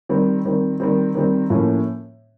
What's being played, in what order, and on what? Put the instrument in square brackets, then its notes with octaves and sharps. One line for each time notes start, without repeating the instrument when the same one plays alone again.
[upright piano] D#3 G3 C4
D#3 G3 C4
D#3 G3 C4
D#3 G3 C4
A2 F3 A#3 C#4